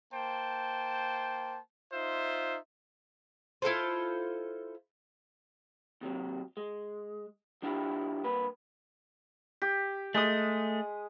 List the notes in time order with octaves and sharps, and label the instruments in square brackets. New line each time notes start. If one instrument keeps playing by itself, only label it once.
[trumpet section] A#3 C5 G5 A5
D#4 F4 C5 E5
[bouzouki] E4 F4 A4 C5
[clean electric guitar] D#2 C3 F#3
G#3
F3 D4 E4 F4 G4
G2 A#3 B4
[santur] G4
[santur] G#3 D#6 [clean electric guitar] A3